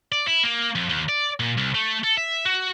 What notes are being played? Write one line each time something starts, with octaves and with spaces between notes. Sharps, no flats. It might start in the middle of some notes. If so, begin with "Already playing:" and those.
D5
E4
A#3
F2
D#2
D5
A#2
C2
A3
A4
E5
F#4